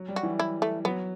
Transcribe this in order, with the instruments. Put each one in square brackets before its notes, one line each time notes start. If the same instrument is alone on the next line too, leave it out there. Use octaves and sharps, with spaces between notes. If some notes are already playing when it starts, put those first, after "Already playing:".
Already playing: [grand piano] F#3
G3
[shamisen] F#4
[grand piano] E3
[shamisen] E4
A3
[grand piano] F#3 [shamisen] B3